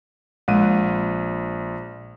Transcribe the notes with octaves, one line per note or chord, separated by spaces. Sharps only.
A#1 G#3 D#7